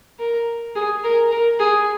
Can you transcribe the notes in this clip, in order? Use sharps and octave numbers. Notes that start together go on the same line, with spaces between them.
A#4
G#4
A#4
A#4
G#4